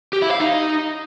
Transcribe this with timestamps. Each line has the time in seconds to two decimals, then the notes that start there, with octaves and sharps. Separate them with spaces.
0.13 G4
0.22 E4
0.31 F5
0.40 D#4